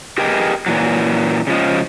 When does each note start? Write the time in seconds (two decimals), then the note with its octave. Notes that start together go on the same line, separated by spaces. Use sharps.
0.18 G4 G#4 A#4 B4 D#5 G5
0.66 A#2 E3 F#3
1.47 C#3 F3 G#3